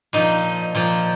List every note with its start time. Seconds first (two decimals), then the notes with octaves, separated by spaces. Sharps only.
0.13 A#2 F3 D#4
0.75 A#2 F3